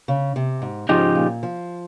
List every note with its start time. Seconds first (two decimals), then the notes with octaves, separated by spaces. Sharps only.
0.08 C#3
0.36 C3
0.62 G#2
0.89 G#2 C#3 F3 D#4 G4
1.15 A#2
1.43 F3